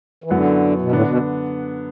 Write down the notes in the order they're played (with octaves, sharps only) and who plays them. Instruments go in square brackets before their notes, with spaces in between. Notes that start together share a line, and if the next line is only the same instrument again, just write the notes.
[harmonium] E3
[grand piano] F#2 F#3 B3 E4 [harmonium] D3
[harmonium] B2
[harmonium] A2 [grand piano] D3 B3 D4
[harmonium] B2